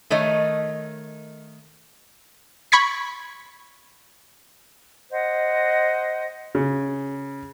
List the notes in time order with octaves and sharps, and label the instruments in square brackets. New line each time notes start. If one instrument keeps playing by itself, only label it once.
[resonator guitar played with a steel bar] D#3 A3 C#5 D#5
[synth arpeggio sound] B5 C#6 G#6 B6
[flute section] C5 D#5 F#5
[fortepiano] C#3